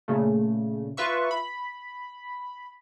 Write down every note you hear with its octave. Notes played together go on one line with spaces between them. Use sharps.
A#2 C#3 A3
F4 B4 E5 C#6
B5